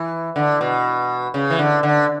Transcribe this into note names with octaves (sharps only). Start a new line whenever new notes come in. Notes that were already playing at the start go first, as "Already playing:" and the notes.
Already playing: E3
D3
B2
C#3
E3
D3
D3